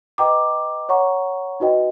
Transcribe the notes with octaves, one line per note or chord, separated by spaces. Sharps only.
B4 D#5 G5 A#5 D6
C#5 F#5 A#5 C#6
D#4 F#4 B4 D#5 G5